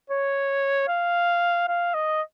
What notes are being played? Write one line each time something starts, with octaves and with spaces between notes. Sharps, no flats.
C#5
F5
F5
D#5